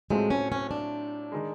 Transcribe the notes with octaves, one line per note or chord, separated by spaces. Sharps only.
A2 F#3 G#3 A3 C4 F4
C#4
C#4
D4
D#3 G#3